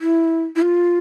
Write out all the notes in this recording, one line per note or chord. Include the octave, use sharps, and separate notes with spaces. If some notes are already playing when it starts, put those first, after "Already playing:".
E4
E4
F4